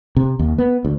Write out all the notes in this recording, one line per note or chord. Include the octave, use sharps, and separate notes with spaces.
C3
D#2
B3
D2